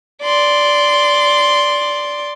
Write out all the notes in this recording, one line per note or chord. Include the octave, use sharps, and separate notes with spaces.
D5 C6